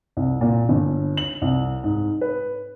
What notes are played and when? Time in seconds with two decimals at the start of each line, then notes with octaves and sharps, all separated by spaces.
0.17 C2
0.41 A#2
0.69 G1
1.17 F#7
1.42 C2
1.84 G#2
2.21 B4